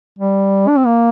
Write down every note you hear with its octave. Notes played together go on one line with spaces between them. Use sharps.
G3
D4
C4
A#3